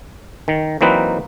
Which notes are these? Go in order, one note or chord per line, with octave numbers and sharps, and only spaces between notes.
D#3
E3 F#3 A#3 C4 D#4 B4